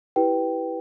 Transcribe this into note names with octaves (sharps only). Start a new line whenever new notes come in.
E4 G4 B4 G5